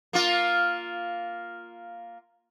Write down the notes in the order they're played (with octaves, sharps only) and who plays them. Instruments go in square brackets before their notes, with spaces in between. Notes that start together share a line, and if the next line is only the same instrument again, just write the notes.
[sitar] A#3 F4